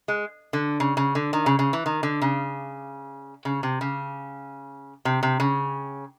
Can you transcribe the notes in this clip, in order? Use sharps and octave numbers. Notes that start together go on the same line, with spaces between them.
G#3
D3
C#3
C#3
D3
D#3
C#3
C#3
E3
D#3
D3
C#3
C#3
C3
C#3
C3
C3
C#3